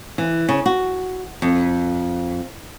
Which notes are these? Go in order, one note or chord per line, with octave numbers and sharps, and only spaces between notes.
E3
C#3
F#4
F2